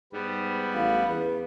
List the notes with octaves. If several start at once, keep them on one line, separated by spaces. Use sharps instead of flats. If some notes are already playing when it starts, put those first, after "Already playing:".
G#2 G3 B3
A1 F5
E2 B4